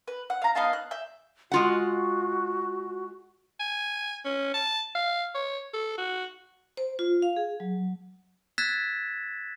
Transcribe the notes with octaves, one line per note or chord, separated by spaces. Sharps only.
B4
F#5
F5 A#5
B3 D#4 F5 A5
F#6
E5 G6
G#3 F4 F#4 F#5
G#5
C#4
A5
F5
C#5
A4
F#4
C5
F4
F5
G#4
F#3
E6 F#6 G#6 A6 B6 E7